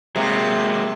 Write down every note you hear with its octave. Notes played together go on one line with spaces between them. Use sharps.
C3 F#3 G#3 A#3